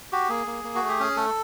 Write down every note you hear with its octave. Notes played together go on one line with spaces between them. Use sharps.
F#4 G4
A#3 G#4
A#3
A#3
F#4
A3
G4
C#4 G#4
A3 A4